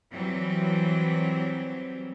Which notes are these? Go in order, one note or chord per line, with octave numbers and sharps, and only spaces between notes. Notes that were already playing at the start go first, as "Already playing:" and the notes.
E3 F#3 G3 C4